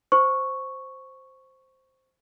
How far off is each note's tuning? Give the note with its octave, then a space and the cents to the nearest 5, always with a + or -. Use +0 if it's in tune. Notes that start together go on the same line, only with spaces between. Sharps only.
C5 +0 C#6 +0